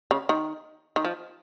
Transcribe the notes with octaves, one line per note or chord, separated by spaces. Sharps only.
C#3
D#3
D#3
F3